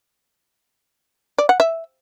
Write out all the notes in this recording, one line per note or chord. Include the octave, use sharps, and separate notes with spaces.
D5
F#5
E5